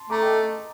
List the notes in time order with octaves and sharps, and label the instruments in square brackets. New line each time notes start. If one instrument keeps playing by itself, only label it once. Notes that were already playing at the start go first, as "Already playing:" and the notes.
Already playing: [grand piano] A5 C6
[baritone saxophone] A3 [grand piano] A#5 D6
[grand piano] D#5 G5